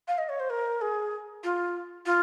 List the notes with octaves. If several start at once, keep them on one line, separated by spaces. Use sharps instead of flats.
F5
D#5
C#5
C5
A#4
G#4
F4
F4